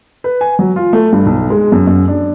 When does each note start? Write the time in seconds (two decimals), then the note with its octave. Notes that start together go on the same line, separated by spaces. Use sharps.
0.24 B4
0.41 G#5
0.59 F#3
0.76 F4
0.93 A3
1.13 G2
1.26 B1
1.50 G#3
1.72 F#2
1.87 F#2
2.08 D4